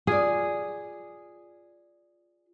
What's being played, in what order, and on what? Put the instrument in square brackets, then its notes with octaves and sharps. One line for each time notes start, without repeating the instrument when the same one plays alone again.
[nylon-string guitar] F4 D5 [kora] G#4